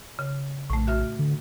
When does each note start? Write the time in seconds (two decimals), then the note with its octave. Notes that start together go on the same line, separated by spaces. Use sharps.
0.19 C#3
0.70 A#1 A2 A3
0.87 F#4 E5 F6
1.19 D3